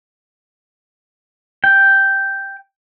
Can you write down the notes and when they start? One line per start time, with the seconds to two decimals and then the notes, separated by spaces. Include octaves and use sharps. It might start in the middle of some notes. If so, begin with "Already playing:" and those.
1.64 G5